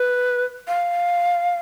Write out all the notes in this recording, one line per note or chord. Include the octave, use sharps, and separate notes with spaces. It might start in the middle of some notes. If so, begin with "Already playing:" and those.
Already playing: B4
F5